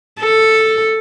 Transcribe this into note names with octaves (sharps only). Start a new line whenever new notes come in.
A4